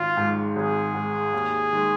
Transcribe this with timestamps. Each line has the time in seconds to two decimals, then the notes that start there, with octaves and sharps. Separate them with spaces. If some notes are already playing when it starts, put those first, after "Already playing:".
Already playing: G#1 F4
0.17 G#2 G#3
0.55 G#1 G#4
0.94 G#2 G#3
1.34 D#2
1.73 D#3 G#3